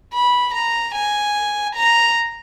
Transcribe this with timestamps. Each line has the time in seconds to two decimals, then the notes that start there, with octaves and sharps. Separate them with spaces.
0.14 B5
0.54 A#5
0.94 G#5
1.75 A#5